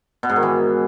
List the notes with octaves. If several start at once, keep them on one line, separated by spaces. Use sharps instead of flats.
B2
G#2
D#3
E3